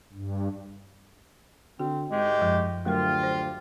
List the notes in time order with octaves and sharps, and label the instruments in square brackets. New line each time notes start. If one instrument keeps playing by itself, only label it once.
[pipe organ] G2
[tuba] D3 [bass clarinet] C4 [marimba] F#4
[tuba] G#2 [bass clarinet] G#3 [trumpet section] A3 G4
[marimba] F#2 F3
[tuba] D2 [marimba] F#3 A3 A#4 [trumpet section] F4 [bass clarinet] G4
[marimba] C5